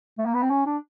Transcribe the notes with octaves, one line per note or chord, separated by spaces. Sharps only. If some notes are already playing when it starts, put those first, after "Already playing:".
A3
A#3
B3
C4
C#4
D4